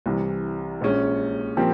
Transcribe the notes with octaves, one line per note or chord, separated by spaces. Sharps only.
C2 C3 E3
A#1 A#2 G#3 C#4
A#2 F3 C4 G4 A#4